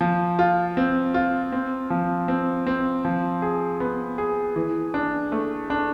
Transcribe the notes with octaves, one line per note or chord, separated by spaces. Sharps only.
F3
F4
C4
F4
C4
F3
C4
C4
F3
G#4
B3
G#4
E3
D4
A3
D4